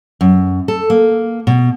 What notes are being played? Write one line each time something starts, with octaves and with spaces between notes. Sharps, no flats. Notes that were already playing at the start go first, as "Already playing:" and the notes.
F#2
A4
A#3
B2